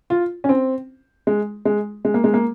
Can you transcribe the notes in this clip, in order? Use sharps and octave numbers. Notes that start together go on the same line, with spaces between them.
F4
C#4
C4
G#3
G#3
G#3
A#3
G#3
A#3